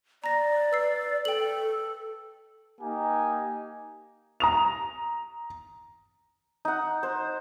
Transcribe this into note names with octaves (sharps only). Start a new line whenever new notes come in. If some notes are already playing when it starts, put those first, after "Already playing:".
D5 A#5 A#6
B4 E6 C7
A4 G5 F#7
A#3 D#4 G4 G#5
A#5 D#6 F7
D#4 F#5
C5